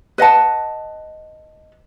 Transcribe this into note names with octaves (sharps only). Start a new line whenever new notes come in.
B4 D#5 F#5 A5